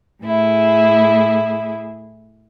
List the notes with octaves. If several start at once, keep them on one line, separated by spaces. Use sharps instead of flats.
A2 E4 G#4